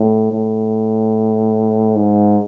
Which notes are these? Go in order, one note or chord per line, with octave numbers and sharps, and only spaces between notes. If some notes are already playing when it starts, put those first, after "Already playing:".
Already playing: A2
A2
G#2